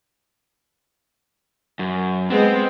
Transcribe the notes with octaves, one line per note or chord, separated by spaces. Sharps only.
F#2
G#3 B3 C4